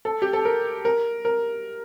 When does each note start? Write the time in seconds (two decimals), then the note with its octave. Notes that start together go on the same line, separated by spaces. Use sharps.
0.05 A4
0.22 G4
0.33 A4
0.45 A#4
0.85 A#4
1.25 A#4